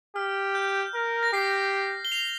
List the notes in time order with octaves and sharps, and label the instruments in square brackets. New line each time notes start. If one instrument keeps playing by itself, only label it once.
[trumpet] G4 [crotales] F6
[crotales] G6
[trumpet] A#4
[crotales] A#6
[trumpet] G4 [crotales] C7
[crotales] G7
C7 F7